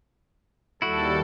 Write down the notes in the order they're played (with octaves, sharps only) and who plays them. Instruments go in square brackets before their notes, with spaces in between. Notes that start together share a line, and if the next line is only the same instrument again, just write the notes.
[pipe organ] D#2 G3 A4 [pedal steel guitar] E4 F#4